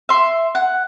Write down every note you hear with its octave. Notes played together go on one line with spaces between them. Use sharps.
E5 C6
F#5